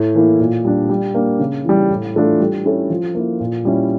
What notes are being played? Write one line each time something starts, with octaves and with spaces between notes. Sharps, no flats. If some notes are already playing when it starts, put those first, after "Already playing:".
Already playing: A2
E3 A#3 E4
A#2
G3 D4
G3
A#3 D4
C#3
E3 G3
A2
E3 A3 D4 F4
G3
C#4 E4 A4 C#5
F3
A#3 E4
A#2
G3 C#4 E4